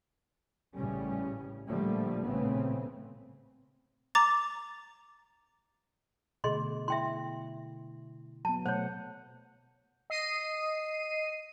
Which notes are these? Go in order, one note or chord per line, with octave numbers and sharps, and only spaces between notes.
A1 A2 C#3 G3 C#4
A#2 D3 F3 G3 A3 A#3
A#1 A2 C#3 A3 B3 C4
A#5 D6 A6
B2 D3 A3 G#4 D#5 C6
E4 E5 G5 C6
F#3 B3 A5
B2 A3 C5 C#5 F#5
D#5 C7 D#7